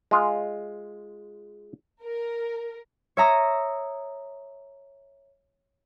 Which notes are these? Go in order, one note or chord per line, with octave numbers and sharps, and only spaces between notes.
G#3 F4
A#4
C#5 E5 A#5 D#6